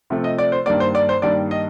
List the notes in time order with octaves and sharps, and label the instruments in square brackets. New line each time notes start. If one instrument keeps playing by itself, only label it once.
[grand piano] C3 F3 A3
D#5
D5
C5
G2 D#3 G3 A#3 D5
C5
D5
C5
G2 D#3 G3 A#3 D5
D#5